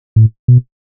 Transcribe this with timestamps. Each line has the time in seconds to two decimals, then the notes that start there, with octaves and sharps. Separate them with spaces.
0.16 A2
0.48 B2